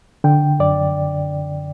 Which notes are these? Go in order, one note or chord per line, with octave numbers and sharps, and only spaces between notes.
D3 G5
F#2 D5